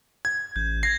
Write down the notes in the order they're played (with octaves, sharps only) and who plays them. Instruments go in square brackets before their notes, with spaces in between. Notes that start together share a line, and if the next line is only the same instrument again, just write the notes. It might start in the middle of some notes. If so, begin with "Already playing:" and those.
[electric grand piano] G#6
[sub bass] A1 [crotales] G6
[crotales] G#6 A#6 [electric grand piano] C7